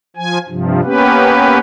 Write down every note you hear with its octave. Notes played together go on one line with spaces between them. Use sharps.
F3 G#5
G2 C3 F3
A#3 B3 C#4 G4 B4